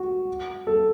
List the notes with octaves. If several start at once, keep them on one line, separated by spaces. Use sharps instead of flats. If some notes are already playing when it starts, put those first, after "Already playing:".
Already playing: F#4
A4